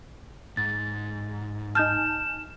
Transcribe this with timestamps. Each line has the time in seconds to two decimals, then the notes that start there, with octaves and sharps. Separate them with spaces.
0.57 G#2 A6
1.75 D#4 G#5 A5 F6 G6 E7